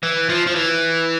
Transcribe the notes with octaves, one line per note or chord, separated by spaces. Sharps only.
E3
F3
F3
E3